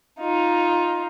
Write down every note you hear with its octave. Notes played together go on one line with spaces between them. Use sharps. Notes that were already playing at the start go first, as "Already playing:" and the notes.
D#4 F4